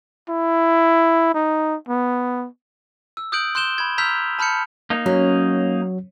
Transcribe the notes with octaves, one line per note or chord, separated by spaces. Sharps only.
E4
D#4
B3
E6
D#6 F#6 G6 D7 F#7
C6 F#6 G6 E7 G7
B5 G#6
A#5 E6 F6 G6 B6 F7
A5 B5 F6 G6 C#7
A#3 D#4
F#3 C#4